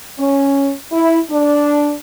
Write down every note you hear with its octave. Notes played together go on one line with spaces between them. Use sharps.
C#4
E4
D4